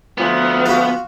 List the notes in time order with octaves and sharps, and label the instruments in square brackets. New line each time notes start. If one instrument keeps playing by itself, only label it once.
[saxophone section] D2 F3 [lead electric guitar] B3
[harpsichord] F4 F#4